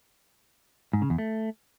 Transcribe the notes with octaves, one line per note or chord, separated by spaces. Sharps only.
G#2
C#3
E2
A3